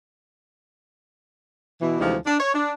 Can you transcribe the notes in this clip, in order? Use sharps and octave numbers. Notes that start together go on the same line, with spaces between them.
B2 E3
D2 C3 E3 F3 G#3 D#4
D4
C#5
D4